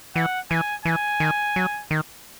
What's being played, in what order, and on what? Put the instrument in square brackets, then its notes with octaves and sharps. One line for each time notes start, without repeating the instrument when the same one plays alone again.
[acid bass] E3 [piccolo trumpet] F#5
[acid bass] E3 [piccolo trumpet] G#5
[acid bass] E3 [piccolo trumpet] G#5
[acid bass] D#3
F#3
D#3